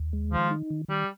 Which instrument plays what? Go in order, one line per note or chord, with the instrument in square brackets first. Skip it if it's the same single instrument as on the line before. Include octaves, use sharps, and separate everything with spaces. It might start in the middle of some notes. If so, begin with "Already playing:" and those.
Already playing: [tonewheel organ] D#2
G#3
[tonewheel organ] D#3 [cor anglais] F3
[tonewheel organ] D#4
D#3
[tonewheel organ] D#3 [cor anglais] G3